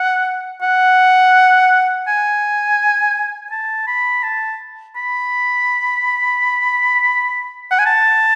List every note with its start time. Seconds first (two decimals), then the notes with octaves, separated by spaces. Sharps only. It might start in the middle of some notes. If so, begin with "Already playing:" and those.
Already playing: F#5
0.62 F#5
2.08 G#5
3.51 A5
3.87 B5
4.24 A5
4.96 B5
7.71 F#5
7.79 G#5
7.86 A5